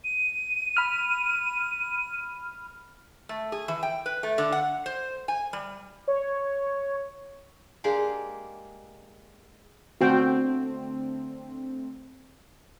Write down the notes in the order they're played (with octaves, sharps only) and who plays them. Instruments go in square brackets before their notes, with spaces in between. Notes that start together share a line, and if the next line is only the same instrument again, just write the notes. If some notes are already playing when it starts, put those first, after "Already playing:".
[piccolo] D#7
[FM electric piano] B5 F6
[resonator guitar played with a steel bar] A3
G#4
E3
G5
B4
A3
D3
F#5
C5
G#5
G3
[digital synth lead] C#5
[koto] G#3 A#3 D4 G4 G#4
[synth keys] D3 A3 C4 [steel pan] F#4 G5